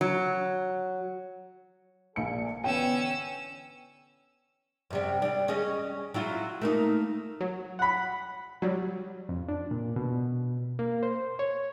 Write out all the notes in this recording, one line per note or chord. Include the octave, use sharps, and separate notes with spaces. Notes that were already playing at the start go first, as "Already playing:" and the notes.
F#3
A#1 A4 D5 G#5 C#7
D3 E3 B3 C#4 G5 E6
F#2 C3 G3
G3 D4
C#4 G#4 D#5
F#3 E4 F4
A3 A#3 D#4
F#3
F#5 B5
F#3 G3
F2
D4
A#2
B2
A#3
C5
C#5